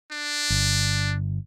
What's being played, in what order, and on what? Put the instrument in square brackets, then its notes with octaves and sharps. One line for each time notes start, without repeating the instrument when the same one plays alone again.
[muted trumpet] D4
[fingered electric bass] G1